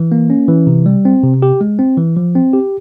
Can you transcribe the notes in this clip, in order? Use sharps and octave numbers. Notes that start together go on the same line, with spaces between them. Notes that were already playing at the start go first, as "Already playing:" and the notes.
Already playing: E3
A#3
C#4
E3
C3
G3
C4
C3
G4
G#3
C4
E3
F3
C4
G4